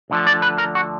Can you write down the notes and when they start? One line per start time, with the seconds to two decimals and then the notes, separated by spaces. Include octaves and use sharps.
0.10 D2 D3 F3
0.27 D5
0.42 B4
0.58 A#4
0.75 F#4